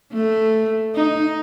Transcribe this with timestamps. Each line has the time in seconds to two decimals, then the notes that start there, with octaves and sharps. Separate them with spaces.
0.13 A3
0.95 D#4